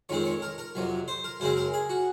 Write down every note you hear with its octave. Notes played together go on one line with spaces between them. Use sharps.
F2 D#3 G#3 C4 C#5
C#5
A#4
A#4
F2 C3 F#3
C5
A#4
F#2 C#3 G#3 C4 C5
A#4
G#4
F#4